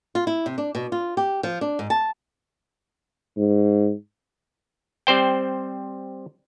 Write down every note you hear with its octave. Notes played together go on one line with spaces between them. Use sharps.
F4
E4
C3
D4
B2
F4
G4
F3
D4
G#2
A5
G#2
G3 C4 C5 G5